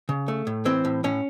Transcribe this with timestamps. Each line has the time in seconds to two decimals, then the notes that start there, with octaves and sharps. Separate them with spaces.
0.09 C#3
0.28 A3
0.47 A2
0.65 E3 C4
0.85 A2
1.04 A2 C#4